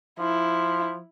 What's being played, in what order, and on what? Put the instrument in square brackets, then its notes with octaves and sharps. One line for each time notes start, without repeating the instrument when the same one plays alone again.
[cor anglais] F3 [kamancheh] E4